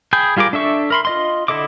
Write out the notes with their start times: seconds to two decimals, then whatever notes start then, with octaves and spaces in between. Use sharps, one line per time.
0.13 G#4 G5 G#5 B5 G6
0.37 G3 F4 G#4 A#4 D6
0.53 D4 A4 E5 C#6
0.90 A#4 B5 C6
1.05 F4 D#5 C6
1.48 D3 E4 A4 D#5 D6